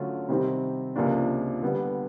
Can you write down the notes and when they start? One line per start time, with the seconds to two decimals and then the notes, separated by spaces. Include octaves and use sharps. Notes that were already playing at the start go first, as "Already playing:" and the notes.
Already playing: D3 F#3 A3 C#4 F4
0.28 C3 D#3 G3 C4
0.96 C#2 C3 F3 A#3 D4
1.62 D3 G3 B3